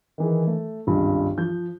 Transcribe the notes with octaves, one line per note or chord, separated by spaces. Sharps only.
D#3 E3 G#4
A3
G#1 C#2 G2
F3 G6